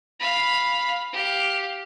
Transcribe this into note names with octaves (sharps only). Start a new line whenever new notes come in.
F5 B5
G4 F5